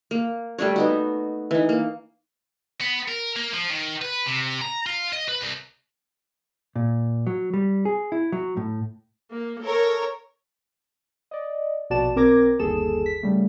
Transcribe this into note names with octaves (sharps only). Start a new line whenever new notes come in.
A#3
G3 A3 D4 C#5
B3 D#4 F#4
E3 D#4
A#3
B3
A#4
A#3
F3
D#3
B4
C3
A#5
F4
D#5
B4
C2
A#2
F#3
G3
G#4
E4
F#3
A2
A#3
A4 A#4 C#5
D5 D#5
A#1 B2 F#4 D5 A5 E7
B1 C4 A#4 D6 G#6 A#6
G1 D#2 G#4 A4 E7
B6
C#3 G3 A3